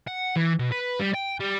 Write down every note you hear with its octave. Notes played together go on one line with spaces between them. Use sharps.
F#5
E3
B2
B4
G3
G5
G3